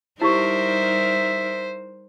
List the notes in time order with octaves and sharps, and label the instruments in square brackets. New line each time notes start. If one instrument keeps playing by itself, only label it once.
[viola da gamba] G3 D#4 A#4 [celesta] E4 G4 C#6 [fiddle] C5 [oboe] E5